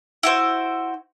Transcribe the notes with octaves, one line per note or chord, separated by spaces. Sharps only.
E4 F#4 C5